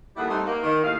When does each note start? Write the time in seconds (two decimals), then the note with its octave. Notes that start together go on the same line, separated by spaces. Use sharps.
0.16 D#2 G3 E4 G#4 A4 F#5
0.30 G3 A3 C4 D#4
0.46 A#3
0.63 D#3
0.83 D#2 A2 D#5 F5